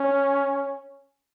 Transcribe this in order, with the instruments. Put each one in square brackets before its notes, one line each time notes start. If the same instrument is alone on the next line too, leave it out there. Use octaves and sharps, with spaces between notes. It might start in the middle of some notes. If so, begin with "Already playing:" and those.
Already playing: [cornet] C#4